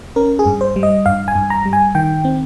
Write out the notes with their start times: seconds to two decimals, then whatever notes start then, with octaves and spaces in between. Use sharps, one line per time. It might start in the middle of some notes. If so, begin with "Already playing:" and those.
0.16 C#4 A#4
0.39 G#4
0.46 G2
0.61 C5
0.76 G3
0.83 D#5
1.06 G2 F5
1.28 G#5
1.35 G2
1.50 A#5
1.66 G3
1.73 G#5
1.95 D#3 G5
2.25 C4